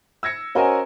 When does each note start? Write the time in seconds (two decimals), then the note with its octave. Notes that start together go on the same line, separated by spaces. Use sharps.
0.23 E6 G#6 A#6 C#7
0.55 C#4 F#4 A#4 C5 D#5 G#5